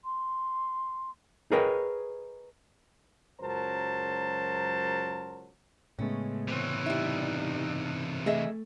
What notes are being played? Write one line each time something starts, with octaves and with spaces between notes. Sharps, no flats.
C6
G#4 A#4 B4 C#5 D#5 G5
C#2 F#2 F#3 A#4 C5 A5
A2 C#3 G#3 A3 B3 C#4
C3 E3 C4 C#5
G3 D#4 E4
A3 G#4 D#5 E5